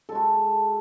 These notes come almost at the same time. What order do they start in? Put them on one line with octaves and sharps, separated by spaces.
A4 G#3 F#4